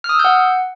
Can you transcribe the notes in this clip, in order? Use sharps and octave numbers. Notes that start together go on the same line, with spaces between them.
F6
D#6
E6
G6
F#5